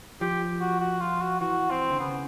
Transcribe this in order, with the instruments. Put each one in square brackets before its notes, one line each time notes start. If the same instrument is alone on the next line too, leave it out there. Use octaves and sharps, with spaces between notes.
[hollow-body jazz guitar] F3 [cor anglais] G4
[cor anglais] F#4
F#4
F4
F#4
[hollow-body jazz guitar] E3 [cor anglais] F#4
[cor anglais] C4
[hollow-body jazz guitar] D3
[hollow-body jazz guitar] C#3 [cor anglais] B3